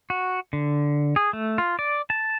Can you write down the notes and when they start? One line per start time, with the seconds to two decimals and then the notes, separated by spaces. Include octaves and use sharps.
0.10 F#4
0.53 D3
1.16 G#4
1.33 A3
1.58 F4
1.79 D5
2.10 A5